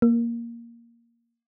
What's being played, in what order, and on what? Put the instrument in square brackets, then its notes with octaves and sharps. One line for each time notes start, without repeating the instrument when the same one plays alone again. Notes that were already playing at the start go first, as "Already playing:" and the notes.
[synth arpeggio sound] A#3